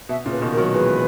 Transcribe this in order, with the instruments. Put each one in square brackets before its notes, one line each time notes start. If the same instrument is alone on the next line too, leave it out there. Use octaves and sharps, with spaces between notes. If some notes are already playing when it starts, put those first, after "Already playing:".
[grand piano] B2 [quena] E5
[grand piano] A#2 C#3
[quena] B4
[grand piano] B2 D#3
[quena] A#4
[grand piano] D#3 F#3
[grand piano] E3 G#3 [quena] B4